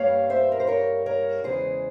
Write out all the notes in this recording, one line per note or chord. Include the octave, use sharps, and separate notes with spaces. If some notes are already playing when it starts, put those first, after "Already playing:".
Already playing: G2 G3 A#3 C#5 F5
C5 E5
A#4
C5
A#4 C#5
A#4 C#5
E2 C#3 E3 G#3 G#4 C5